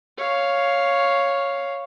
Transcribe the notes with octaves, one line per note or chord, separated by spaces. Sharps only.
C#5 F5